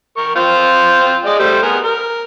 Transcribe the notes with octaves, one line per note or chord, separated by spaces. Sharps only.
A#4 C#6
C4 F4 C5
G#3 D5 D#5
G3 A3 C5
B3 G#4 A#4
A#4